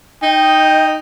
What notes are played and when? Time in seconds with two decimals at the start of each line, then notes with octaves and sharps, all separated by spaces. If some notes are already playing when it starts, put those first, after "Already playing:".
0.22 D#4 D#5 G5